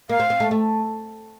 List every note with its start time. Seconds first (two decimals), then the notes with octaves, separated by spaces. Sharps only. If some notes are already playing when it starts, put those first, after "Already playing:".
0.09 A#3 F5
0.20 C4
0.30 C4
0.40 A3
0.51 A3